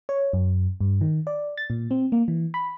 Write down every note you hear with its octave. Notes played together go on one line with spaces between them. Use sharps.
C#5
F#2
G2
D#3
D5
A6
A#2
C4
A#3
E3
B5